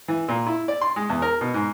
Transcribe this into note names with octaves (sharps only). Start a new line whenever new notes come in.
E3
A#2
E4
D5
C6
G#3
E2
A#4
B2
G#2